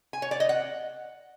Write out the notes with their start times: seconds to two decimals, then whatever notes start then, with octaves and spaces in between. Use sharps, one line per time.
0.13 G#5
0.22 C#5
0.31 D5
0.40 D#5
0.49 F#5